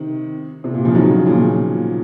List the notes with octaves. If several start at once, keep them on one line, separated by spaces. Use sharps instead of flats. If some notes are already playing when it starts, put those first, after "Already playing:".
Already playing: C3 D#3
C3
A#2
C#3 F3
D#3 F#3
C#3 F3
A#2 C#3
A#2